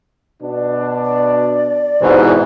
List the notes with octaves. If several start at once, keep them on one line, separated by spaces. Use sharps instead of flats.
B2 D4
D5
C2 G#2 B2 E3 C5